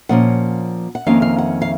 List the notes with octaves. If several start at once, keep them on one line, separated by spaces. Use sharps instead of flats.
A#2 F3 A#3 C#4 F#5
F#5
F2 D#3 A#3 C#4 F5
F5
F#5
F5